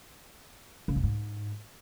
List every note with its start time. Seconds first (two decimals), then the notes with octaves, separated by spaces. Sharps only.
0.88 C#3
0.96 F2
1.03 G#2